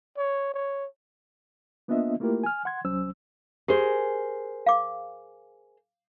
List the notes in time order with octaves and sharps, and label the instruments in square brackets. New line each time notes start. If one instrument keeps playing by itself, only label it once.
[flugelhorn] C#5
C#5
[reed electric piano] A#3 B3 D4 F4 D#5 E5
A3 A#3 E4 F4 G4 A#4
G#5 F6
F#5 C6 G#6
C2 F#3 C#4 C5 E6
[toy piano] G4 [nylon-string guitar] G#4 A#4 C5
[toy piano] F5 D6